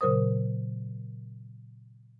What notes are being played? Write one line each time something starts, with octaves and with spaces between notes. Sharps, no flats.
A#2 C#3 F#3 A#4 C5 D#6